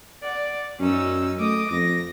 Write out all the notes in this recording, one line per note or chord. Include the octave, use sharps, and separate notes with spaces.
D5 F#5
F#2 C#4 D#4 E6
A3 D#5 D6 D#6
F2 A#6